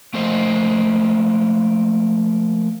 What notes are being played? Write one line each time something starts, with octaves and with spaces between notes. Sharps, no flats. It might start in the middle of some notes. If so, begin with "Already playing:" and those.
F3 A3 A#3 C5 D#5